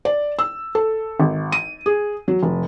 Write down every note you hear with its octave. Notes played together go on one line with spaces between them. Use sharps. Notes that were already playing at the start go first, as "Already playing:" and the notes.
D5
E6
A4
G#1
D#7
G#4
F#3
F1